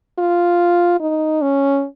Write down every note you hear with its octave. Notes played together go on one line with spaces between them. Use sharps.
F4
D#4
C#4